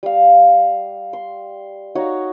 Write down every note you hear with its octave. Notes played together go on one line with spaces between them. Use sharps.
G3 F5
C6
D#4 F#4 C#5